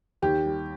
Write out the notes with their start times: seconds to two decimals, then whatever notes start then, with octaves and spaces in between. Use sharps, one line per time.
0.22 D#2 G4
0.46 G3